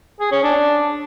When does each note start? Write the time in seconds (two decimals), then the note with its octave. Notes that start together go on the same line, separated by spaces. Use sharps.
0.20 G#4
0.32 C#4
0.43 D4